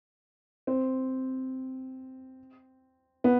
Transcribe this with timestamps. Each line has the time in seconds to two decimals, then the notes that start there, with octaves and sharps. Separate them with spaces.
0.67 C4
3.24 B3